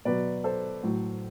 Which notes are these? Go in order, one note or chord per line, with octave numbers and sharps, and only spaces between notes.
B2 F#3 B4 D5
A4 C5
A2 F#3